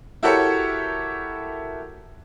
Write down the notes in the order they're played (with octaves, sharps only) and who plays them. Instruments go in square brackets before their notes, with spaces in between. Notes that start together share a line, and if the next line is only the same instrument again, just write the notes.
[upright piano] E4 F#4 G4 A4 A#4 C#5